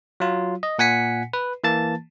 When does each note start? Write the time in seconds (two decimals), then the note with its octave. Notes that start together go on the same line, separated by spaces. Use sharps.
0.20 F#3 F4
0.63 D#5
0.79 A#2 F#5 G#5 B6 C#7
1.33 B4
1.64 E3 A#3 A5 A6